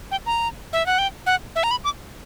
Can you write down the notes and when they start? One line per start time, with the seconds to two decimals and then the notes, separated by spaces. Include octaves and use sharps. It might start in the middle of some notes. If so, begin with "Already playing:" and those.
0.11 G5
0.26 A#5
0.73 E5
0.86 F#5
0.98 G5
1.26 F#5
1.56 E5
1.63 A#5
1.71 B5
1.84 D6